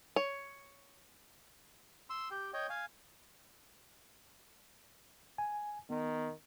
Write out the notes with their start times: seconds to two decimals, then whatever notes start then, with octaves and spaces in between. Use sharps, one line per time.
0.16 C#5
2.10 C6 E6
2.31 G4 G5
2.53 C#5 D#5 G5
2.70 F5 G#5
5.38 G#5
5.90 D#3 B3